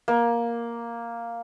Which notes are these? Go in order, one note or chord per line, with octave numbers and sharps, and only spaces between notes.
A#3